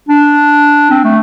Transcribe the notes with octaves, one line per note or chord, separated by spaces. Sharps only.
D4
C4
A3